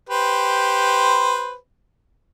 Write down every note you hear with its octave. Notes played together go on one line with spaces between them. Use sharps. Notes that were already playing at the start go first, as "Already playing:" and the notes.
G4 B4 C5